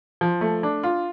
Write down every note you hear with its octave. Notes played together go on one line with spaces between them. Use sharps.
F3
A3
D4
F4